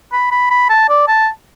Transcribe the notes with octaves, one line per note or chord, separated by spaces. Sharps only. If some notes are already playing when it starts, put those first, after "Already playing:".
B5
B5
B5
A5
D5
A5